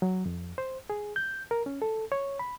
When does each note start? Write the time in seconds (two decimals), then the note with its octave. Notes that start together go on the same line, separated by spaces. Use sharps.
0.02 F#3
0.26 F2
0.58 C5
0.90 G#4
1.16 G6
1.51 A#4
1.66 C#4
1.82 A4
2.12 C#5
2.39 B5